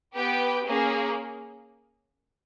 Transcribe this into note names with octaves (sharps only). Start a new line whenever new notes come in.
B3 G4 B4 G5
A#3 C#4 G#4